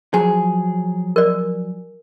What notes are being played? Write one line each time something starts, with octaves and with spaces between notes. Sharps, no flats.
F3 F#3 G#4
A#4 D5